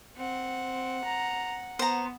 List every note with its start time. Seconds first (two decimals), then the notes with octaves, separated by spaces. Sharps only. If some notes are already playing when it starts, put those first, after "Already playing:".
0.17 C4 F#5
1.04 A#5
1.79 B3 C5 A#5